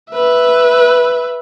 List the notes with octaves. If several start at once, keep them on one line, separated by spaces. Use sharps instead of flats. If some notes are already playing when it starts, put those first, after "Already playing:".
B4 E5